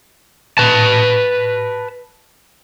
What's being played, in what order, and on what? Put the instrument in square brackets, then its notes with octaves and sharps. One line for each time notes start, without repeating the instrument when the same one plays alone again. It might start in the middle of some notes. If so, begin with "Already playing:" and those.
[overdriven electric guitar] B4 A5